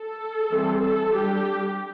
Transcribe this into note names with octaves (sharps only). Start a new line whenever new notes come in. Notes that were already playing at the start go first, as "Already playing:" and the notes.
Already playing: A4
E3 G3 C4
A4
G3 D4 G4